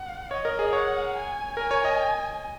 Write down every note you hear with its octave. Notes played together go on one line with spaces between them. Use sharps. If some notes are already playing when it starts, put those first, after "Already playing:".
Already playing: F#5
C#5 D#5
A#4
G#4
C#5 F#5
G#5
A#4 G#5
C#5
D#5